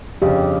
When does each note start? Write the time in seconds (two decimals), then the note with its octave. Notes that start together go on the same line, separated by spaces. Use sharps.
0.22 G1 F2 C#3 G4